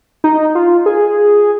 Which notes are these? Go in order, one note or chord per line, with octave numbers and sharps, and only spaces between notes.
D#4
F4
G#4